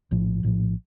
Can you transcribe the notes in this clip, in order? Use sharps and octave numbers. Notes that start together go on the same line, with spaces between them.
A#1 A2 F3
A#1 A2 F3